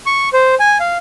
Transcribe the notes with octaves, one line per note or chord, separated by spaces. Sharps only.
C#6
C5
G#5
F5